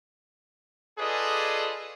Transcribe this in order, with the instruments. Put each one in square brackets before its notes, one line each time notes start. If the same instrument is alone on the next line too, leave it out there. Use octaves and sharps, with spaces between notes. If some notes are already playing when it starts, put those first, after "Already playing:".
[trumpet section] F4 G#4 A4 B4 D5 D#5